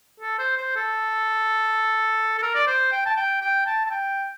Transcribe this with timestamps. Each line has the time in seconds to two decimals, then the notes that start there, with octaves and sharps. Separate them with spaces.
0.20 A4
0.38 C5
0.57 C5
0.76 A4
2.38 A4
2.42 A#4
2.55 D5
2.67 C5
2.92 G5
3.06 A5
3.17 G5
3.41 G5
3.66 A5
3.86 A5
3.90 G5